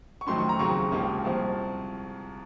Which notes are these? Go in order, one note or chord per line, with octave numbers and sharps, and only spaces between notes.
C#6
F2 D#3 F#3 A3 C#4 C6
C#6
A#5
D#2 C#3 F#3 C4 C#6
C#2 C3 F3 A#3 C#4
C2 A#2 F3 C4